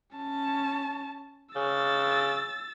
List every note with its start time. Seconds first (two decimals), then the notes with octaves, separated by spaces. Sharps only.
0.16 C#4 A5
1.56 C#3 E6 A6